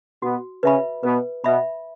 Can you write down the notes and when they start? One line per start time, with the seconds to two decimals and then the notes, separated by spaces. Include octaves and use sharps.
0.22 B2 B3 F#4
0.63 C#3 C#4 B4 E5 B5
1.03 B2 B3 B4
1.44 B2 B3 E5 B5